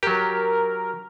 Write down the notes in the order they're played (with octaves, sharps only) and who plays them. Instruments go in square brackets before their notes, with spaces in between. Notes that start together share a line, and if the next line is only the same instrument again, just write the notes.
[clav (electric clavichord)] F#3 G4 [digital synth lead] A#4